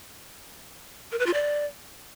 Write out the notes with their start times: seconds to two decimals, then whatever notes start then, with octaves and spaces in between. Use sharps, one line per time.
1.12 A#4
1.19 B4
1.26 F4
1.34 D5